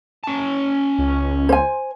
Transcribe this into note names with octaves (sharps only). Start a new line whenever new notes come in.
C#4 A5
C#2
C5 G#5